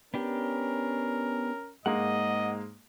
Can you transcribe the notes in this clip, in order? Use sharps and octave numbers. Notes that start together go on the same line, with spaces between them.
B3 C#4 D4 G4 A#4
G#2 G#3 A#3 D#5 F#5